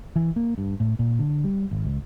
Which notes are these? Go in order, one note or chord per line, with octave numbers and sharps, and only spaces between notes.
E3
A#3
G2
A2
A#2
D3
G3
G#1
C#2